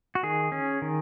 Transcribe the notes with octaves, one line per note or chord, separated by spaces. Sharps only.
F#4
D#3 G#4
C#4
D#3